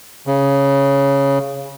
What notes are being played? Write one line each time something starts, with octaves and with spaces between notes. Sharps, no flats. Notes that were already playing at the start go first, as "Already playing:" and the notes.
C#3